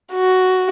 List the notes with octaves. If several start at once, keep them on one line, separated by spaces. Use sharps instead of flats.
F#4